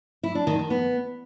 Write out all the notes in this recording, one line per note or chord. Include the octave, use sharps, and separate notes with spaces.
E4
D4
D#3
D#3
B3